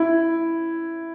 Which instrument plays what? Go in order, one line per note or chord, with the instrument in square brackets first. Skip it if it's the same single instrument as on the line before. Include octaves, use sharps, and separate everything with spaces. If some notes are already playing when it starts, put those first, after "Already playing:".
Already playing: [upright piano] E4